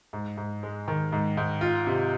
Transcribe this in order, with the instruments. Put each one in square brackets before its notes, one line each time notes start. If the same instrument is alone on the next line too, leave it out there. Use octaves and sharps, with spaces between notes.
[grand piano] G#2
G#2
G#3
D#3
G#2
G#2
F4
C3